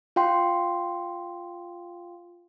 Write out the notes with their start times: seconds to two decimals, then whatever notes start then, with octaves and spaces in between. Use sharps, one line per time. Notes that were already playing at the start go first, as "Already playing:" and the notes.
0.16 F4 F5 G5 C6